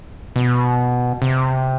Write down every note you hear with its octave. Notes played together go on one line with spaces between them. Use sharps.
B2
C3